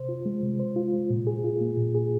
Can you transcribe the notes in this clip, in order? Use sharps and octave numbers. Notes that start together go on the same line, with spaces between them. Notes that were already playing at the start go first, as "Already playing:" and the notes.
Already playing: C3 C5
F4
G#3
C3
C5
F4
G#3
A#2
G#4
F4
A#3
A#2
G#4